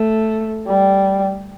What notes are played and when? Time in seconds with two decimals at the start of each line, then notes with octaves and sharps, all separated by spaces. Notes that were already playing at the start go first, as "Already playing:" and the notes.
Already playing: A3
0.67 G3